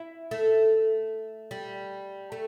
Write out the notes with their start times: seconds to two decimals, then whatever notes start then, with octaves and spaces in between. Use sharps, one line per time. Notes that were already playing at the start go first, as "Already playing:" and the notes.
Already playing: E4
0.31 A3
1.51 G3
2.32 A3